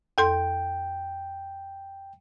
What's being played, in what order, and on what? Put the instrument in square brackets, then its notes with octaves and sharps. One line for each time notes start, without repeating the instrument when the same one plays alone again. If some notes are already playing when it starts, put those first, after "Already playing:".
[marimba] F2 A4 C6 [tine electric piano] G5